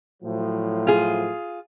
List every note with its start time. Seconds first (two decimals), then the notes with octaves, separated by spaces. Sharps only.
0.23 A2 F3 F#3
0.87 F4 G#4